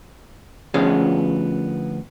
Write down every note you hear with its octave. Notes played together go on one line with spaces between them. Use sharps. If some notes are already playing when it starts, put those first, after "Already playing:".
D2 F3 B3 C#4 G#4 F5